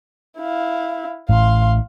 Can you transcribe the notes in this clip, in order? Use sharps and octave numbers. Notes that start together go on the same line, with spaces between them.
E4 F5
A1 A2 F5 C6